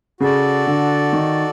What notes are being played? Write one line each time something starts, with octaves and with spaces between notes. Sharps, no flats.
C#3 F#4 A4 D5
D3
D#3